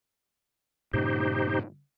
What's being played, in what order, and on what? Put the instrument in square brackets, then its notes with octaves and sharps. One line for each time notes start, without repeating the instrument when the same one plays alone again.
[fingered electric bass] G2 A#2 C#3 [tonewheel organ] D#4 G4 C5